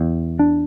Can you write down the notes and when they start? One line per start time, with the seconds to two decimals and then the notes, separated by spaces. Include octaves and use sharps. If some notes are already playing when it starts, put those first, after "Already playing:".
Already playing: E2
0.39 D4